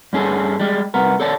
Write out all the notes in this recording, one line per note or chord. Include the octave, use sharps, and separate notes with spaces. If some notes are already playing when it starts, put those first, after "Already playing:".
G2 C#4 G#4 A4
G3 G#3 G4
C2 B3 A#4
A4 C#5 D5 A5